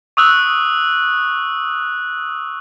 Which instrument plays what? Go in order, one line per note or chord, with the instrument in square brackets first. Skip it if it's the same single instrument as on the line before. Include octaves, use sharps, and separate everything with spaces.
[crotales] C#6 D#6 E6 F#6